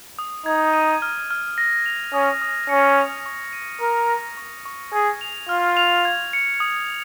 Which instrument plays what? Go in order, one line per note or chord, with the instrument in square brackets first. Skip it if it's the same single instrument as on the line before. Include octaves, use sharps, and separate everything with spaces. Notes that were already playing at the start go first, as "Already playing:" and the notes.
[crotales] D#6
[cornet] D#4 [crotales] G#6
[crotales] D#7
F6
F6
A#6
F7
[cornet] C#4 [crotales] D#6
[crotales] D#6
[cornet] C#4 [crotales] C#7
[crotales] F7
C#6
D#7
[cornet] A#4 [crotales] F6
[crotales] A#6
C#6
C#6
[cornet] G#4 [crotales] G#6
[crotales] F7
[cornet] F4 [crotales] F6
[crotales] F7
G#6
C#7
D#6